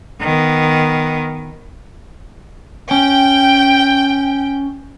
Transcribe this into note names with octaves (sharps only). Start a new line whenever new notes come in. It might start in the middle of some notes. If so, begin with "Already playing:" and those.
D#3 B3
C#4 G5